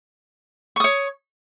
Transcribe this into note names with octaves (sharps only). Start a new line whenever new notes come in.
C#5 C#6 D#6